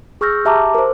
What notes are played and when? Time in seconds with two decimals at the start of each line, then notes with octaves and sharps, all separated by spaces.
0.21 G#4 C#6 E6 F6 G6 A#6
0.45 G4 E5 A5 A#5 D6
0.75 A#4 C5